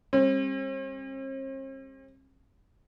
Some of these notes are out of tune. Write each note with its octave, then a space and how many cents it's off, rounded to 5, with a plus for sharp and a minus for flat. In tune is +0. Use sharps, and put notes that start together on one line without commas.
G3 +40 C4 +45